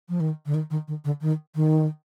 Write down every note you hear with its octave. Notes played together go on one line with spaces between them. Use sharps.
F3
D#3
D3
D#3
D#3
D#3
D3
D#3
D#3